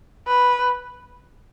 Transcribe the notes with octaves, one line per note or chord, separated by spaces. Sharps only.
B4